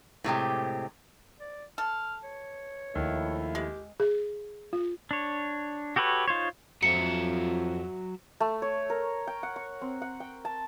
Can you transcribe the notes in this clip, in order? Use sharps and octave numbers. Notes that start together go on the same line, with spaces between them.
A2 C3 G#3 G4
D5
A4 F6
C#5
D#2 F3 A3 E4
G#3 G4
G#4
F4
D4 C#5
F#4 G4 A4 B4 C#5
D#4 F4 C5 C#5
F2 F#3 E5 C#7
A3
C#5
A#4
G5
F#5
C#6
C4
F#5
G5
A5